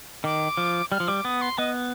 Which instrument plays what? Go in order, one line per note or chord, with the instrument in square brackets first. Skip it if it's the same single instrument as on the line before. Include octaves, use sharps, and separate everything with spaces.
[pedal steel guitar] D#3 [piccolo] D6
[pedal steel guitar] F3
[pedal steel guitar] G3 [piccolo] F6
[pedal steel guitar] F3
[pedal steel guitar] G3 [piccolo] D6
[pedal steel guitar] B3 [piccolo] D#6
[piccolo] C6
[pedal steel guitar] B3 [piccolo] D#5